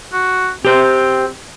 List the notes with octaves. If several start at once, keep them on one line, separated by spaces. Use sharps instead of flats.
F#4
C4 G4 C5